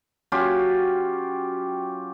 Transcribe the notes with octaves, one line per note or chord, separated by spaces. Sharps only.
F#3 C#4 F4 G4